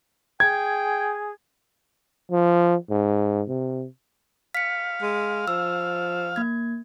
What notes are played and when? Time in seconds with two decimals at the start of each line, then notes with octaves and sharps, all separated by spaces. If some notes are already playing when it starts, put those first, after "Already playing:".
0.40 G#4 G5 G#6
2.31 F3
2.90 G#2
3.48 C3
4.55 F5 B6 C#7
5.02 G#3
5.48 F3 E6
6.36 A#3 G#6